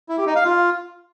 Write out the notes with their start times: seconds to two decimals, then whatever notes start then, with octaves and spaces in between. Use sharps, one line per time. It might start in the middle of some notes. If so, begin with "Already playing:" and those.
0.09 E4
0.18 G4
0.27 D#4
0.36 F5
0.44 F4